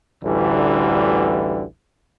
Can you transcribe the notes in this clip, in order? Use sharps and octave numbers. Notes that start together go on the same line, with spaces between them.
A1 D2 D3 E3 G3